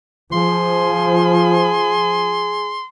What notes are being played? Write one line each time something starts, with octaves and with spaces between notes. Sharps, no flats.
F3 G#4 C6